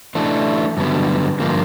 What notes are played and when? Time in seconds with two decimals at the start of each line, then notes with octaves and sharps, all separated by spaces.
0.15 E3 A3 D4
0.77 G2 D3 F#3 B3
1.40 G2 D3 F3 A#3